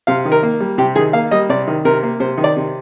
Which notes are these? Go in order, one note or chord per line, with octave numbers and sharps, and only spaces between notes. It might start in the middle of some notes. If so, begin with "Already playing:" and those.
C3 F5
D#3
A#4
A#3
G3
C3 G4
D#3 G#4
A#3 F5
G3 D#5
C3 D5
D#3
C3 A#4
A#3
C3 C5
D#3
D5
C3